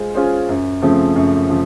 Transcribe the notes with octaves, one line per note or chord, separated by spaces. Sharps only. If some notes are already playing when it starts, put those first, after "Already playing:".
Already playing: G#3 F4 G#4 C5
C#4 F4 G#4 C5
F#2
C#3 F3 A3 C4
F#2
C#3 F3